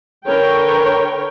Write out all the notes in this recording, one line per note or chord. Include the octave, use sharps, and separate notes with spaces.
D3 A#4 B4 C#5 G5